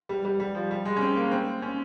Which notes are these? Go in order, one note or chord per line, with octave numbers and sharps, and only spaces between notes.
G3
G3
G3
F3
G3
G#3
C#4
C4
A#3
C4
C#4